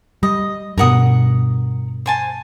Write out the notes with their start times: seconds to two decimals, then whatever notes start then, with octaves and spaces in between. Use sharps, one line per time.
0.23 G3 D#5
0.78 G2 B2 A#4 F#5 D#6
2.06 C5 G#5 A5